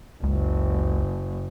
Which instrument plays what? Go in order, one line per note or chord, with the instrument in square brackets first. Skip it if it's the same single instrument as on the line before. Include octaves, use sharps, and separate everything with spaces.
[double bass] F#1 [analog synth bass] C#2